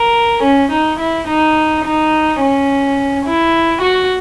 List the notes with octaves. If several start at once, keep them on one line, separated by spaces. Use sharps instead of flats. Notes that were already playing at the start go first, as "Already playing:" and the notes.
Already playing: A#4
C#4
D#4
E4
D#4
D#4
C#4
E4
F#4